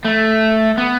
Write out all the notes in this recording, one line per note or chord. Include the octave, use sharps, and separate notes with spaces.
A3
B3